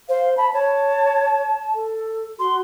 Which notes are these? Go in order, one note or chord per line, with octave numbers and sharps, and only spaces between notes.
C5 F5
A5 B5
C#5 A5
A4
F#4 C6